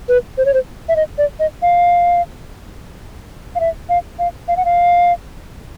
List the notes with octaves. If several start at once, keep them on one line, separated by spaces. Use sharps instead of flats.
B4
C5
C#5
C5
E5
D#5
D5
D#5
F5
F5
E5
F5
F5
F5
F#5
F5